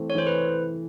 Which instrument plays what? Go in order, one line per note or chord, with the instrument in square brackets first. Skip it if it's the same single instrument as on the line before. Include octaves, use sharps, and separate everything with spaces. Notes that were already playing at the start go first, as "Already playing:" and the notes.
Already playing: [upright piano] E3 A3 C4
[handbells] C#5
[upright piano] E3 [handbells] C5
[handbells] B4